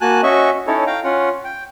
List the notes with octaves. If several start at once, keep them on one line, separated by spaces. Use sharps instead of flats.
A#3 F#4 G#5 A5 F#6
C#4 F#4 D#5 E5 C#6
C#4 D#4 E4 A4 C#5
F5 G5 A#5
C#4 F4 F#5
G5